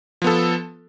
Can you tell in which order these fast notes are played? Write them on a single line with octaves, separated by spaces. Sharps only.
F3 B3 A4